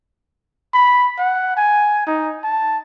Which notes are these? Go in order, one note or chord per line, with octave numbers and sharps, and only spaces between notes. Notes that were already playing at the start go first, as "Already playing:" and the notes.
B5
F#5
G#5
D#4
A5